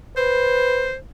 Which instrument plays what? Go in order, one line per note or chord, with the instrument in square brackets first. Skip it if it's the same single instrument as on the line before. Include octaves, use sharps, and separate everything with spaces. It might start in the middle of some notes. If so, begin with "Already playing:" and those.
[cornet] B4 [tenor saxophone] C5